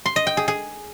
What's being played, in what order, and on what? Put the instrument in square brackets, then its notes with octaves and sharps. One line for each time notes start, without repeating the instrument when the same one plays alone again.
[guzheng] C6
D#5
G5
G#4
G#4